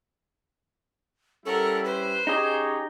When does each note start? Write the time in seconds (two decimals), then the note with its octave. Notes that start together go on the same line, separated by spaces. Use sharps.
1.45 G3 C#4 E4 A4 A#4 F#5
1.85 B4 C5
2.27 C#4 D#4 G4 G#4 C#5 D#5